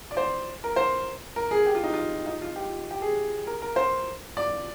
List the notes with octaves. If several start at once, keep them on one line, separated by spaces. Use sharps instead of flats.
D5
C5
A#4
C5
A#4
G#4
G4
F4
D#4
F4
D#4
F4
G4
G4
G#4
A#4
A#4
C5
D5